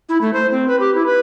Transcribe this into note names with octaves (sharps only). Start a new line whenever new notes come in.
E4
A3
C5
C4
B4
G4
E4
B4